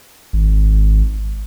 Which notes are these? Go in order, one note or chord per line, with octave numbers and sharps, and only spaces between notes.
G#1